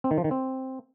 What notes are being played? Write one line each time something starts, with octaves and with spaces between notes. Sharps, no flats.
C4
D#3
F3
D#3
C4